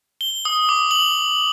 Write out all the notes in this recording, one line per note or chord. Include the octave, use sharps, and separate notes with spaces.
G7
D#6
D6
F#7